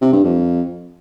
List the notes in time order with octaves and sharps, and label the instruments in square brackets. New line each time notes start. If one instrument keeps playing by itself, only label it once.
[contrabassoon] C3
G2
F2